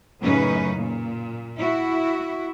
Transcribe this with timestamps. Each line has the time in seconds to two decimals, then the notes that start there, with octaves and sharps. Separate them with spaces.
0.21 F#2 A2 C#3 C#4 D#4 B4
0.76 A#2
1.58 E4 F#4